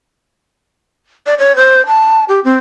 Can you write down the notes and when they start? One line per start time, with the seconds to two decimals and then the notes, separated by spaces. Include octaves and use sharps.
1.26 D5
1.39 C#5
1.56 C5
1.86 A5
2.29 G4
2.44 C4